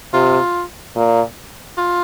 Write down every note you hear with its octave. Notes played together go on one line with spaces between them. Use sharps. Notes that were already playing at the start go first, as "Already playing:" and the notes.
C3 F4
A#2
F4